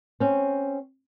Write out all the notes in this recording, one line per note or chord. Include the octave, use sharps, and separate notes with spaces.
C4 C#4